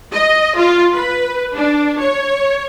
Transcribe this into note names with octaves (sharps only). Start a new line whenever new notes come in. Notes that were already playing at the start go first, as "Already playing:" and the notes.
D#5
F4
B4
D4
C#5